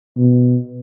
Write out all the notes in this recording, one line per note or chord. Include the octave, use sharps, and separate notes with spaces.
B2